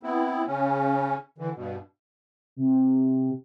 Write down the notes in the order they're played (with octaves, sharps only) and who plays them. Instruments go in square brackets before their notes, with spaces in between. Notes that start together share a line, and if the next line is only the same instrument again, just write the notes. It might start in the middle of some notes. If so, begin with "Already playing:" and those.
[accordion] B3 C4 E4
C#3 C#4
D3 E3
G2 B2
[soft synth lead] C3